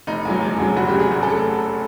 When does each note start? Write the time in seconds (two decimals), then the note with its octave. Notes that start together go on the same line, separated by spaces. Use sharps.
0.07 F1 D#4
0.25 E2 C#3 F#3
0.43 F1
0.59 E2 C#3 F#3
0.77 F1 F#4
0.88 G4
0.94 E2 C#3 F#3
0.99 G#4
1.11 F1 G#4
1.23 A4